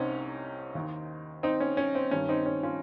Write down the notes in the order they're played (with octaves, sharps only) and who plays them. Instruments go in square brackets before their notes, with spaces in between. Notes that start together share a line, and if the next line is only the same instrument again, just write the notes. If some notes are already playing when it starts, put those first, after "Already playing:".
Already playing: [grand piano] C2 C3 C4 C#4 D#4
D#2 D#3
C4 D#4
C#4
C#4
C4
G2 D#3 C#4
C4 D#4
C#4
C#4 F4